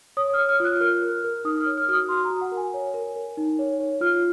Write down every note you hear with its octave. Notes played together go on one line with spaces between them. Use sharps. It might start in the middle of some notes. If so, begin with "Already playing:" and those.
C#5 D#6
C#5 F6
F6
F4 F#6
A#4 F6
A#4
A#4
D#4 D#6
F6
C#5
F6
F#4 D#6 F6
F#4 C6
A#5
F#4
F#5
A#4
G#5
C#5
A#4
A#4
D#4
C#5
C#5
F4 F6